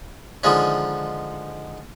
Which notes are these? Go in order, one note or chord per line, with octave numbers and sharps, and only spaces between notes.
D3 D#3 F3 G#3 C#4